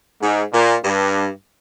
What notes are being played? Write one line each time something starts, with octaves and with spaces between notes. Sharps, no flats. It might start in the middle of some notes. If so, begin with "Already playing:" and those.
G#2
A#2
G2